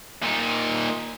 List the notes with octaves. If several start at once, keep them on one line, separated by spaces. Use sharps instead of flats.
A#2 D#4